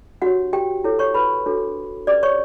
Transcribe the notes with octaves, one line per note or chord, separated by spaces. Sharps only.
D4 F#4 G4 C#5 F#5
G4 G5
E4 A4 C#5
C#5 C#6
B4 B5
D4 F#4 A4 C#5
C#4 G4 B4 D5 D6
C#5 C#6